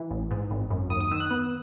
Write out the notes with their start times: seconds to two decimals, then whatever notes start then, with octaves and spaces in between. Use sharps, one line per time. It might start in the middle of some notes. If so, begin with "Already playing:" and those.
Already playing: E3
0.11 A1
0.31 G#2
0.51 G#1
0.70 F#2
0.90 D#2 D#6
1.01 D#6
1.11 D#3 E6
1.20 F#6
1.31 B3